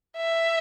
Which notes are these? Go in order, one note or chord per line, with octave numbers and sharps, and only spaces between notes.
E5